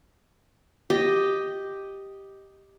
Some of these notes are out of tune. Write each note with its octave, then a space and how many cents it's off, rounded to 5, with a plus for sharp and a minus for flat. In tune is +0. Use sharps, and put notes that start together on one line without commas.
G4 +0 D#5 +0